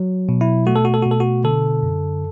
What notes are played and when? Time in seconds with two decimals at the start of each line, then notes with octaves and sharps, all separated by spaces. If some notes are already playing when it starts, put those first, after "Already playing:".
Already playing: F#3
0.29 B2
0.41 E4
0.67 A3 F#4
0.76 A4
0.85 F#4
0.94 A4
1.03 B2 F#4
1.11 A4
1.20 F#4
1.44 D3 A4
1.83 F#2